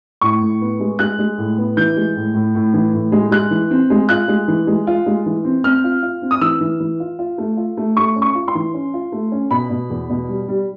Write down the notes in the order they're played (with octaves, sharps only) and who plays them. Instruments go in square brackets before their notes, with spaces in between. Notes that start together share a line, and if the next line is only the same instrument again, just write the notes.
[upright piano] A2 C#6
A2
B3
G#3
G#3 F#6
G#3
A2
B3
E3 G6
G#3
A2
A2
A2
E3
A2
G#3
G#3 F#6
E3
C4
G#3
F4 F#6
G#3
E3
G#3
F4
G#3
E3
C4
C4 F6
F4
F4
C4
D#6
E3 E6
E3
E3
F4
F4
A3
F4
A3
A3 C#6
C#4
C#6
F4
C6
E3
C#4
F4
A3
C#4
B2 B5
B2
E2
B2
G3
G3